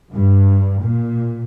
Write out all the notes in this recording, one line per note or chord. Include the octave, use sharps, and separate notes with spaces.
G2
A#2